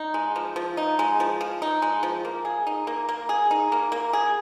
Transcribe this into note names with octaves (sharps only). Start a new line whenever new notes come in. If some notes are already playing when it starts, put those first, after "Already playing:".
Already playing: D#4
G#3
F3
F3
D#4
G#3
F3
F3
D#4
G#3
F3
A#3
G#4
D#4
A#3
A#3
G#4
D#4
A#3
A#3
G#4